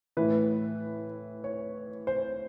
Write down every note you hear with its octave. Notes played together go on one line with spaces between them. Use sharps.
A2 E3 B4
C#5
C5